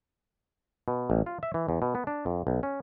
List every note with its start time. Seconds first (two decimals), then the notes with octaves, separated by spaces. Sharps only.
0.88 B2
1.10 A1
1.26 F4
1.43 E5
1.54 E3
1.69 E2
1.82 B2
1.95 B3
2.07 D4
2.26 F2
2.47 B1
2.63 C#4